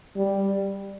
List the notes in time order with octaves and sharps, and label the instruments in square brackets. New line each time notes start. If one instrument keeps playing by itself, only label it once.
[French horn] G3